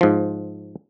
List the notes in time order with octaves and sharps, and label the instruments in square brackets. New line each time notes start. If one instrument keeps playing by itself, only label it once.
[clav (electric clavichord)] G#2 F3